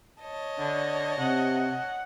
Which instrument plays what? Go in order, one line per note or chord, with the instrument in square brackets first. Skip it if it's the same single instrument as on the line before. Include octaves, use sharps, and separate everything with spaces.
[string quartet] C#5 D#5 A5
[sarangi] D3
[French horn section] C3 [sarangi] F#5